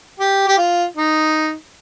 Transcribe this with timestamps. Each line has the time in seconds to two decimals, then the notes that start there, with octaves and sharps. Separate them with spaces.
0.20 G4
0.48 G4
0.58 F4
0.97 D#4